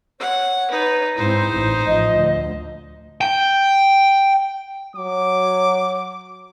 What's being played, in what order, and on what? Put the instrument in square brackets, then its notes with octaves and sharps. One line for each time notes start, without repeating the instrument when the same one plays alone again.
[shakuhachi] C#5 [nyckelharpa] F#5
[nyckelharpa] D#4 B4
[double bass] G#2 C4 [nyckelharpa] D#4 C5 [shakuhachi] E4
[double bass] A1
[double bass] A1 F3 [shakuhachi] D#5
[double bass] D2
[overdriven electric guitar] G5
[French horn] F#3 [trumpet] D6